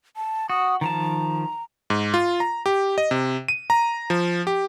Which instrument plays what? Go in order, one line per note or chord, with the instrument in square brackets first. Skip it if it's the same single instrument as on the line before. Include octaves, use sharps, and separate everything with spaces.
[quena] A5
[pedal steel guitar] F#4 [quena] D#6
[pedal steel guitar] D#3 F3 A5 [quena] A#5
[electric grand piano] G#2
F4
A#5
G4
D#5
C3
D#7
A#5
F3
G4